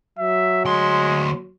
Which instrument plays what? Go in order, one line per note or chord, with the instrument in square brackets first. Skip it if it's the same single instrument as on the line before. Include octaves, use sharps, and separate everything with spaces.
[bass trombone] F#3 [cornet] E5
[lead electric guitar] D2 C6 [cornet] G#3